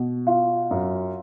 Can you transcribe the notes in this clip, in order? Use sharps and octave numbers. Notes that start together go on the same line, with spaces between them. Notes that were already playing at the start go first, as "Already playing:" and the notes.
Already playing: B2
F4
F#2